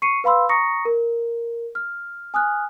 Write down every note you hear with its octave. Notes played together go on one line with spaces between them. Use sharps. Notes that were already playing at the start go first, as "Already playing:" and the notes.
C#6 C7 C#7 D#7
B4 F5 B5 C6 E6
A#5 C#6 D#6 A#6 C#7
A#4
F6
G#5 D#6 F6 F#6